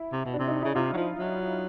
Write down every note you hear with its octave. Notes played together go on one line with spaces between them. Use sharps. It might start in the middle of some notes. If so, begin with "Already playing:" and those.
Already playing: E4
C3
B2
D4
C3
D#4
C#3 E4
C3 F4
F#3
F3
F#3